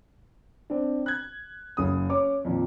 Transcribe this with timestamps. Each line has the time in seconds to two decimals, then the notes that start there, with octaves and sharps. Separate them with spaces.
0.70 C4 D4
1.06 F#6 G#6
1.77 F#1 C#3 D#6
2.09 C#4 C#5 D6
2.45 F2 A#2 D#3 F3